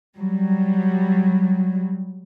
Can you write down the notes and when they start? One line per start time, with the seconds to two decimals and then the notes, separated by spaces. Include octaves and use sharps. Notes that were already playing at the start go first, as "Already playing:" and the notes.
0.16 F#3 G3